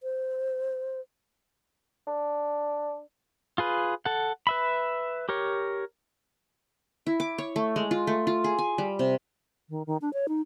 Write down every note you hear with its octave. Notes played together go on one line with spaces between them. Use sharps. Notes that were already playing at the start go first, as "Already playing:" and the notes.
C5
D4
F4 G#4 B4
A4 F#5
B4 E5 B5
G4 A#4 C#5
E4
D6
C#5
A3
G#3
F4
A3
F4
G#4
G#5
G3
C3
D#3
D#3
D4
C#5
D#4